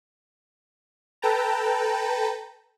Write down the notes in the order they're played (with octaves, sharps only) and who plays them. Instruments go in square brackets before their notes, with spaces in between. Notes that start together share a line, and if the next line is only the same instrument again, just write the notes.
[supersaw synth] A4 B4 G5 A5 A#5